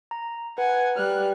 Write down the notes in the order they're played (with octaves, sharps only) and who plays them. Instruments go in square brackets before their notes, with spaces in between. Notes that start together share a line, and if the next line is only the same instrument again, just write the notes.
[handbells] A#5
[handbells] B4 [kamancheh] F#5 G#5
[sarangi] G3 [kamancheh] F6 F#6